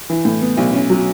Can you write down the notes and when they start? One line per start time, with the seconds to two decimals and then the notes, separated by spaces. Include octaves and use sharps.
0.10 E3
0.25 A2
0.42 B3
0.57 B1
0.73 C#4
0.90 F#3